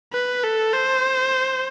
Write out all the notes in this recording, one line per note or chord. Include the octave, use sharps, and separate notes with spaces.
B4
A4
C5